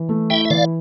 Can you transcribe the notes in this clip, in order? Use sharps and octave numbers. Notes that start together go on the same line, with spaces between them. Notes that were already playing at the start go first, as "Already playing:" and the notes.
Already playing: E3
A3
E4 E5 G5
E5
E3 D5 F5